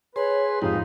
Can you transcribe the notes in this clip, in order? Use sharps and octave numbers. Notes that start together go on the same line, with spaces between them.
G#4 B4 C#5 C6
F2 G#2 D#4 F4 G4